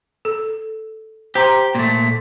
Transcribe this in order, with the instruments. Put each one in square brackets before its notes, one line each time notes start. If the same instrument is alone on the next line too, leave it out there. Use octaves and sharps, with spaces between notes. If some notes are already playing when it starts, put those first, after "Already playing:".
[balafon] A4
[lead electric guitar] G4 [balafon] C5 A#5 C6
[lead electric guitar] A#2 A3